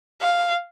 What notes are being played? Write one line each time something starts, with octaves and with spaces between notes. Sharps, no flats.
F5